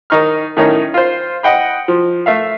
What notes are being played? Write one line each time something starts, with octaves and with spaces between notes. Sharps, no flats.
D#3 D#4 C#6 F6
A2 D#3 C#4 D#4
F4 C5
D#5 F#5 G5 B5
F3
A3 E5 F5